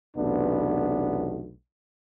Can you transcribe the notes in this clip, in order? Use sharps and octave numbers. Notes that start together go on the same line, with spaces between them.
B1 E2 C3 A3 B3 D4